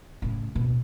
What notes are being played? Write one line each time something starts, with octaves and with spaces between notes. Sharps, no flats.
A2 C#3
D1 B2